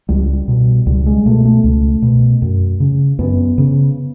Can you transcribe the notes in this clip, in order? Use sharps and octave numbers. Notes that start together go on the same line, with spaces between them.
C#2 G3
B2
C#2 G3
G#3
B2 A3
A3
C#2
B2
F#2
C#3
F#2 B3
C#3